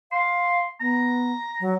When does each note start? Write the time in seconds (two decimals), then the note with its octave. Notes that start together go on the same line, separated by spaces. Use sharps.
0.12 F5 C6
0.80 B3 A#5
1.60 F#3